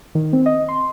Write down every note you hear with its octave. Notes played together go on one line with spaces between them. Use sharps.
D#3
C4
D#5
C6